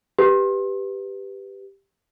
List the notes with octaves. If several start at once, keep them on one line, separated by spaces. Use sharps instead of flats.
G4 B4